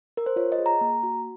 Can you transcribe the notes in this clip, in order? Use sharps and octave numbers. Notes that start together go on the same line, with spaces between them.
A#4
C5
F4 C#5
D#5
G#4
A#5
A#3
F#4